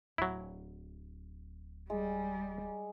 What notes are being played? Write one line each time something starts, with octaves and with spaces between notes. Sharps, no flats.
D1 F#3 E4
G3 G#3